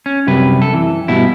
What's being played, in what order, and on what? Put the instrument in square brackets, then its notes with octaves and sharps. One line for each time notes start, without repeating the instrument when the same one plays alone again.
[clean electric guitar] C#4
C2 F#2 C3 B4
A4
E3
G2 B2 E4